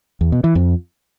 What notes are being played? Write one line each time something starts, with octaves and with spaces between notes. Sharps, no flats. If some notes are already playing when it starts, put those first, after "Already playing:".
E2
B2
E3
F2